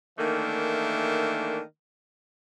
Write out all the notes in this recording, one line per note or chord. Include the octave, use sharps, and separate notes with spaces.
D#3 E3 A3 A#3 D4